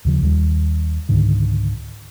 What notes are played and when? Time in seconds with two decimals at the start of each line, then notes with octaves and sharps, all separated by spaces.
0.05 D#2 C#3 F3
0.22 D#2 G3
1.09 C#2 G#2 D3 D#3